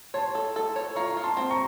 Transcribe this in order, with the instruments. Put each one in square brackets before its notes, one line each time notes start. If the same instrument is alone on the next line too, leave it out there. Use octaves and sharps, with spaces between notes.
[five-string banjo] C#5 [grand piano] A5 C6
[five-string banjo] A4
A4
C#5
[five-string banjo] F4 [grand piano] A#5 C#6
[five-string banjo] F4
[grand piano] A5 C6
[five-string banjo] C4
[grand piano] A#5 C#6